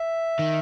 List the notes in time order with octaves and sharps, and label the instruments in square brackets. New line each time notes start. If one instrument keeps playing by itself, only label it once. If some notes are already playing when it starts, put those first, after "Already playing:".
Already playing: [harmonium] E5
[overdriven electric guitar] D#3